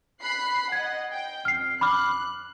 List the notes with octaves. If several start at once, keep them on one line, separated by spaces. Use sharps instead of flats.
B5 F#6 C7
D#5 F#5 G#6
G5
F2 F6 C7
B5 D6 F6 F#6